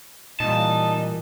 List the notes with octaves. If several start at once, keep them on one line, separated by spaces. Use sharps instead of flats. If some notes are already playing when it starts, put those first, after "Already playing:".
A#2 E3 G3 D#4 A5